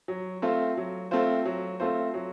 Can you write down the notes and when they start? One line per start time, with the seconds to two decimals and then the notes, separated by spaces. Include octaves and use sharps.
0.08 F#3
0.42 A3 C4 F4 C5
0.77 F#3
1.11 A3 C4 F4 C5
1.46 F#3
1.80 A3 C4 F4 C5
2.14 F#3